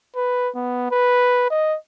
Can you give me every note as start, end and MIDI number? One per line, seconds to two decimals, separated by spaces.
0.16 0.49 71
0.55 0.91 59
0.91 1.48 71
1.51 1.76 75